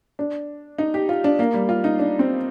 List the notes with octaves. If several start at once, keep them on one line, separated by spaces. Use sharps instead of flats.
D4
D#4
G4
F4
D4
A#3
G3
F4
D#4
D4
C4